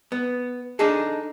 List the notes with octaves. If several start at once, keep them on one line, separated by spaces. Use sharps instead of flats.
B3
D4 D#4 G#4 A4